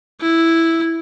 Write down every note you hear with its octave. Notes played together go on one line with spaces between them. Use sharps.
E4